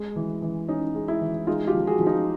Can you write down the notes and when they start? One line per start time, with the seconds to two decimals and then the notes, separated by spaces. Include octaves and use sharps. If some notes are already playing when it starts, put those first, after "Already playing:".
Already playing: G#3
0.16 E3
0.42 E3
0.68 C#4 D#4
0.95 G#3
1.08 E4
1.21 E3
1.47 G#3 D#4 F4
1.67 F4 G4
1.74 F3
1.87 F#4 G#4
2.00 F3
2.06 D#4 F4